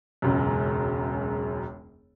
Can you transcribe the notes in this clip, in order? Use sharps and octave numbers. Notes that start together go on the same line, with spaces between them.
E1 C#2 F#2